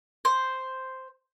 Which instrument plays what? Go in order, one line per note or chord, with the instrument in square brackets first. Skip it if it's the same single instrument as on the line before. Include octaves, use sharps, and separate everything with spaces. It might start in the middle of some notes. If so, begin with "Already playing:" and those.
[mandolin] C5